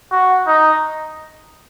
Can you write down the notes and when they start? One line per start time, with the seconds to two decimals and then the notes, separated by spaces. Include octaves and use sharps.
0.11 F#4
0.46 D#4